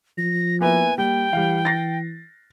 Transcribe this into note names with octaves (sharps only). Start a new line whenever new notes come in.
F3 A#6
A#3 B3 E4 G#5
G3 A#3 G5
E3 G3 F5
A6 A#6 C7